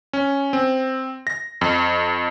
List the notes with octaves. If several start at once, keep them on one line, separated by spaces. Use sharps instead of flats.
C#4
C4
A#6
F2